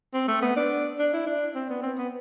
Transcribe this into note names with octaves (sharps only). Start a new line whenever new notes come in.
C4
A3
B3
D4
D4
E4
D4
C4
B3
C4
B3